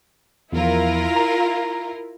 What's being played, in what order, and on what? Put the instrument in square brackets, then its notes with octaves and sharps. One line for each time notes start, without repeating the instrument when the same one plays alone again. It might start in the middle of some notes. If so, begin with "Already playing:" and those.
[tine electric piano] E2 F3 [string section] E4 F4 A#4
[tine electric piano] A#5